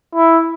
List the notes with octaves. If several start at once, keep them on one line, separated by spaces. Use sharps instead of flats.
E4